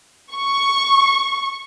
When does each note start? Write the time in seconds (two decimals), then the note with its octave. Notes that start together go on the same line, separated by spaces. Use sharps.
0.34 C#6